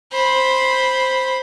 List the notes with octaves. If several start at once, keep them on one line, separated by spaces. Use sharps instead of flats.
C5 B5